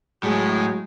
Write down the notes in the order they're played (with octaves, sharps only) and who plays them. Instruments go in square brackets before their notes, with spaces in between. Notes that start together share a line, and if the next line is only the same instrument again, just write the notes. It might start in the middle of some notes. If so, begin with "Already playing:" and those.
[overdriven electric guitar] A2 [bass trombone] F#3 [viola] G#3 [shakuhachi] G#4